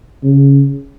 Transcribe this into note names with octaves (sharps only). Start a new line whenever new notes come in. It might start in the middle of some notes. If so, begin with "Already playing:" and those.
C#3